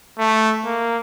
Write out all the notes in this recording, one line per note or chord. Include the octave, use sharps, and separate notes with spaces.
A3
A#3